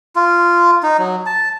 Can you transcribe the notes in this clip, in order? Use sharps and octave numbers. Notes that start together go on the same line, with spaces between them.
F4
D#4
F#3
A5